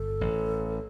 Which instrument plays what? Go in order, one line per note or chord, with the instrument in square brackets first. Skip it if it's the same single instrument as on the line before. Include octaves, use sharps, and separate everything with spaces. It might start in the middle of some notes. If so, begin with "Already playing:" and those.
Already playing: [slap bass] G1 [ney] A4
[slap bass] A1